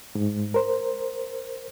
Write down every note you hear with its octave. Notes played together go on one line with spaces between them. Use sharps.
G#2
A#4 C5